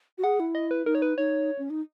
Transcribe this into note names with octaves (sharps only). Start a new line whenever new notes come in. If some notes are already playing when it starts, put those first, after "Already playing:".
F#4
G#4 F#5
E4
D#5
B4
D#4 A#4
C#5
B4
D#4 C#5
C#4
D#4